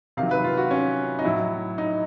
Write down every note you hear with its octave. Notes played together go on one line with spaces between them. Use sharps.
C3 D#3 F#3 F5
B4
F4
F#4
C#4
D#4
A2 F#3 E4
D#4